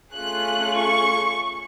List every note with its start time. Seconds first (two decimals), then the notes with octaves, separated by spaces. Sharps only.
0.13 A3 C#4 F4 G#4 F#6
0.76 C#6